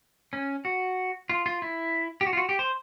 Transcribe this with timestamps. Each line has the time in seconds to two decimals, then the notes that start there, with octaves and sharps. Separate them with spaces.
0.33 C#4
0.65 F#4
1.30 F4
1.46 F4
1.62 E4
2.21 G4
2.27 F#4
2.33 F4
2.37 F#4
2.49 G4
2.59 C5